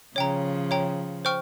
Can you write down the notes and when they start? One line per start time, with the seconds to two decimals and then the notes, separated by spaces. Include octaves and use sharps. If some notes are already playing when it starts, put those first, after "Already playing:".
0.16 C#3 F3 C#5 G5 A#5
0.71 C#5 G5 A#5
1.25 C5 G5 C#6 F6